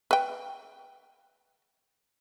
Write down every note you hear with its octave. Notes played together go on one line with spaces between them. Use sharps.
B4 G5